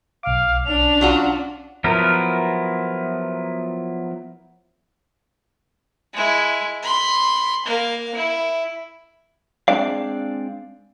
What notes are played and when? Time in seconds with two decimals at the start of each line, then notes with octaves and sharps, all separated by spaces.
0.23 B1 F5 D6
0.65 C#4 D4 F7
1.01 F#3 F4 F#4
1.84 F3 F#3 B3 E4 A#4
6.14 G#3 E4
6.82 B5 C6
7.66 A#3 F5
8.15 E4
9.68 G#3 C4 D4 D5 F5